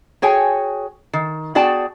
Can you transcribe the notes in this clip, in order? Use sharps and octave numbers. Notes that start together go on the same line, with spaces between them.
F#4 G#4 C#5 G5 G#5
D#3
B3 F#4 G#4 D5 G5 A5